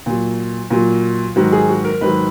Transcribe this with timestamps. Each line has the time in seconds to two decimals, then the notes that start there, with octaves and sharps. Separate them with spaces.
0.06 A#2 F#3
0.70 A#2 F#3
1.36 G#2 D#3 F#3 F#4
1.52 G#4
1.69 F#4
1.85 A#4
2.01 G#2 D#3 F#3 B4